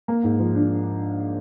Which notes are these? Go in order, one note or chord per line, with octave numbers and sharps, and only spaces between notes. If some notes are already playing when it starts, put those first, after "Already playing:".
A#3
G#2
F3
D4